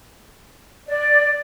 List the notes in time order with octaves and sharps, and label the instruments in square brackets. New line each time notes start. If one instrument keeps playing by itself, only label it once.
[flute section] D5